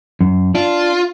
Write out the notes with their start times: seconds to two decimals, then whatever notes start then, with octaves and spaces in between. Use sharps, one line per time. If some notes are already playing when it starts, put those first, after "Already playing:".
0.21 F#2
0.55 D4 F4